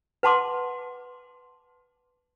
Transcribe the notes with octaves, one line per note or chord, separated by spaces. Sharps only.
B4 F#5 A5 C6 D6